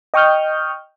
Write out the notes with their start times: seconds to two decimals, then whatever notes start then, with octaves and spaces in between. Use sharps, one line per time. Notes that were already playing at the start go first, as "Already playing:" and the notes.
0.14 D#5 G5 C#6 D#6 F6 G6